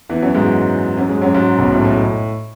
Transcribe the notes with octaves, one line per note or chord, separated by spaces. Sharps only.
E2 E3
F#2 F#3
G#2 G#3
F#2 F#3
G#2 G#3
F#2 F#3
G#2
B1 B2
A2
A2